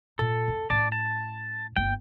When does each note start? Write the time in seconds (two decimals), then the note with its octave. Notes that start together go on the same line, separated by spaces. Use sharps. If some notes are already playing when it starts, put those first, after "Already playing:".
0.19 A#2 A4
0.48 F2
0.70 A2 C#4 D5 A5
0.92 A5
1.76 G1 A#3 G5